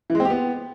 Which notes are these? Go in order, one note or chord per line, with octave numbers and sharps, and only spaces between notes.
E3
G#3
C4
G4
B3